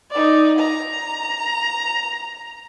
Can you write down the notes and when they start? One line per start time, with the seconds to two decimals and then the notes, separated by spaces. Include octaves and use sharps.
0.11 D#4 D5
0.59 A#5